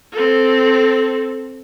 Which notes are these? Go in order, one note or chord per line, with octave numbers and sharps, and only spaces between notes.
C4 A4